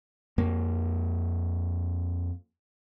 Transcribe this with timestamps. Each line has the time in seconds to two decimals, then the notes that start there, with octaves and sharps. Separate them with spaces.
0.38 F2 A#3